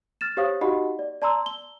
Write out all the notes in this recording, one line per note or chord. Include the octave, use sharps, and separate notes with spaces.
F6 A6 E7
G4 C5 C#5 F5 D#6
D#4 F#4 G4 D#5 F#5 B5
D5
D5 A5 A#5 C6 E6
G7